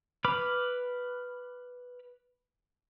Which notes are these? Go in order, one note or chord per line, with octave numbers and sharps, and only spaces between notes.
B4 B5 D6 F6